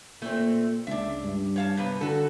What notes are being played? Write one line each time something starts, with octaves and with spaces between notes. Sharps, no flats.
A#2 A3 C4
C#2 D4 E5
G2
C#5 F5 A5
C3 B3
D3 F#4 A4